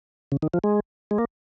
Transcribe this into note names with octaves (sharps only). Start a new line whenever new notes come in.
C#3
D#3
F3
G#3
G#3
A#3